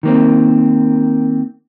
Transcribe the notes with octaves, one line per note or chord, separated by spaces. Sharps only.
D#3 A#3 C4